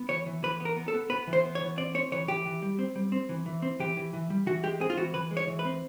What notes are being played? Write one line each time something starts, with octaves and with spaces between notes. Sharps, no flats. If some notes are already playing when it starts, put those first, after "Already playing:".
Already playing: B3
E3 C#5
E3
E3 B4
B3
A#4
B3
A4
B3
B3 B4
E3
C5
B3
C#5
E3
C4 D5
C4 C#5
E3 C#5
E3 G4
E3
G3
C4
G3
C4
E3
E3
C4
E3 G4
E3
E3
G3
E3 F#4
G#3 G4
C4 G#4
F4
E3 F#4
E3 B4
G#3
C#5
E3
B4
C4